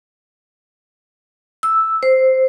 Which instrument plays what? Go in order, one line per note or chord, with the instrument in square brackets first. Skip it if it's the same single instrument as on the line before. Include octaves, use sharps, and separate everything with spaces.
[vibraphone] E6
C5